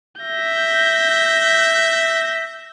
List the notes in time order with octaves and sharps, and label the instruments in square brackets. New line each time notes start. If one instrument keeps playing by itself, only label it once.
[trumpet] E5 [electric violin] G6 A#6